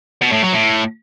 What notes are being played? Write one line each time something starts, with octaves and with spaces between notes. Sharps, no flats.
B2
A2
F#3
A2